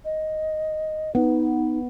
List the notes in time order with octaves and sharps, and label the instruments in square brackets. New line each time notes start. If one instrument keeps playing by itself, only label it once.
[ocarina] D#5
[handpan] B3 [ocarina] D#4